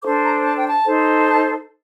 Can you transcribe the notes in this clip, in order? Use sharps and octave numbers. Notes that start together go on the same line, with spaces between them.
D4 A4 C5 D6
A#5
A5
G5
A5
D#4 A4 C5
A5